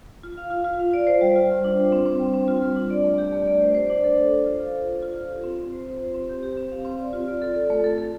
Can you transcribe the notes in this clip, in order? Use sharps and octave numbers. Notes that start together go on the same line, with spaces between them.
F4
F5
F4
F4
F5
D5
C5
G3
F4
G3
D4
C5
C4
C4
G3
C4
F4
G3
D4
D5
A3
G4
A3
D5
C5
C5
D4
A4
A4
C5
F4
F5
F5
F4
F4
F4
G4
C4
C4
C5
C5
C5
C4
G4
G4
C4
F5
C4
D5
F4
D5
A4
A4
A3
A4
A4